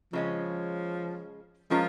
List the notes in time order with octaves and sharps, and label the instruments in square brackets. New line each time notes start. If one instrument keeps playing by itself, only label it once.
[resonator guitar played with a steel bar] C#3 G#3 C#4 [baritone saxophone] F3
[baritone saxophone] F3 [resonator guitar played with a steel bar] G#3 C#4 F4 A#4